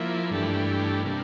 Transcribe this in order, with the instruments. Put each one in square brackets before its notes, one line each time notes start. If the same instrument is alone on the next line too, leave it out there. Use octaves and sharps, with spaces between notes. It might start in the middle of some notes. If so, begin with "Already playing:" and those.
Already playing: [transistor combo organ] F3 A#3 E4
G2 E3 A3 D4 G4
C3 G3 A#3 D4